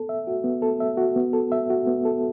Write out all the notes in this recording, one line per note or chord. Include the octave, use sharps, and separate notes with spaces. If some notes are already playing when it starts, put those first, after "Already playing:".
Already playing: B3 A4
E5
F#4
B3
A4
E5
F#4
B3
A4
E5
F#4
B3
A4